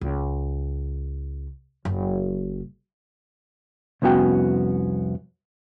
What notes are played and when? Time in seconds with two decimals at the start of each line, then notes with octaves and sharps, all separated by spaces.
0.01 C#2
1.85 F#1
4.02 C2 F2 B3 C#4 F#4 G5